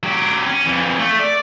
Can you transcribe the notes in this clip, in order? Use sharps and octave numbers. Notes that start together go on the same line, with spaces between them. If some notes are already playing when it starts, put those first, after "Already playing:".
F#3 G4
C#4
F2 E3
A3
D5